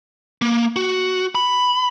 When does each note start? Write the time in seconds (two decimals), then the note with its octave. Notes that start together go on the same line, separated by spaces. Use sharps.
0.42 A#3
0.76 F#4
1.35 B5